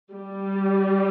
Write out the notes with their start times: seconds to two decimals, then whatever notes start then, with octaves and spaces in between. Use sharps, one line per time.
0.12 G3